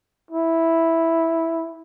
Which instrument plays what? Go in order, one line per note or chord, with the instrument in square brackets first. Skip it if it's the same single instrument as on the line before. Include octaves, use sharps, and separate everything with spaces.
[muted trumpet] E4